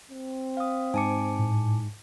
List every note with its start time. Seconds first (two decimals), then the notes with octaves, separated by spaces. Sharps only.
0.11 C4
0.57 F5 D#6
0.94 G#2 G#5 A5 D6 C#7
1.39 A2